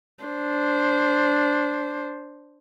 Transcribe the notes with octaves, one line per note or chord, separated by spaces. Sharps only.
D4 C5